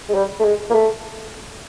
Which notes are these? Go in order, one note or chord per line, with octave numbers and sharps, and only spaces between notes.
G#3
G3
A3
G#3
A#3
A3